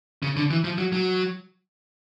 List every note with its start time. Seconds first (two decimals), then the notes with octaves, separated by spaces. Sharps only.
0.23 C#3
0.37 D3
0.51 E3
0.64 F3
0.78 F#3
0.93 F#3